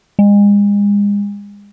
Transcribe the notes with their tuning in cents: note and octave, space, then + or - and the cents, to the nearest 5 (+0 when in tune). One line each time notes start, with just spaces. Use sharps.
G#3 -35